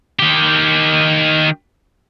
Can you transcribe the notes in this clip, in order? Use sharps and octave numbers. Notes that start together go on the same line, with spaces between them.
D#3 G4